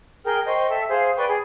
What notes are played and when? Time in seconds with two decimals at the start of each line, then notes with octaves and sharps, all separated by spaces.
0.24 G#4 A#4 G5 F6
0.45 C5 D#5 G5 C#6
0.69 A4 E5
0.89 G#4 C5 F5
1.17 B4 D5 G5 C#6
1.28 G#4